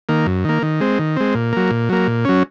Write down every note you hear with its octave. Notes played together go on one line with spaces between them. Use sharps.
D#3 A#3
F#2
D#3 A#3
D#3
G#3 C4
D#3
G#3 C4
A#2
F#3 A#3
A#2
F#3 A#3
A#2
F#3 C#4